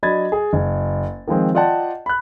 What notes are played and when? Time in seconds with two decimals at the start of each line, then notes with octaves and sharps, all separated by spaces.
0.03 F#3 D4 D#5 B5 G#6 A6
0.32 G#4
0.53 F#1
1.27 D#3 F3 G#3 C4
1.55 F4 D5 D#5 F#5 G5 A5
2.06 B5 F#6